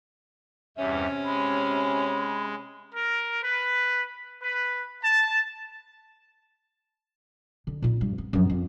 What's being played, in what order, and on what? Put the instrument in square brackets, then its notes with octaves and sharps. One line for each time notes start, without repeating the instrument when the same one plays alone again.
[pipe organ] E2 G2 [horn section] C3 C#4 [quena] E5
[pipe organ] G#3 [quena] B5
[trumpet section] A#4
B4
B4
A5
[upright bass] D3
A#2 D#4
G2
B3
F#2 F3
F2